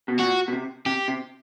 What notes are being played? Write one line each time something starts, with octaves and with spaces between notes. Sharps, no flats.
B2
A#2 F#4
B2
C3
C3 G4
C3